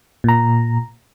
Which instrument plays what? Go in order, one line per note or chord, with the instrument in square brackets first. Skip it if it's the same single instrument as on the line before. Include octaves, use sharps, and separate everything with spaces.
[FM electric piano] A#2 A#5